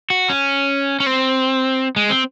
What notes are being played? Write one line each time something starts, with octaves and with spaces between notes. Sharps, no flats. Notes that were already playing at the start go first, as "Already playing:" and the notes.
F#4
C#4
C#4
C4
G#3
C4